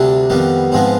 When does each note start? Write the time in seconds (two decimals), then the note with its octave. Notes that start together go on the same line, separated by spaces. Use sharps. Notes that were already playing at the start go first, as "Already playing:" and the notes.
Already playing: D2 C3 G3 D4
0.30 F2 D#3 G3 B3
0.72 G#2 F3 G#3 B3 C4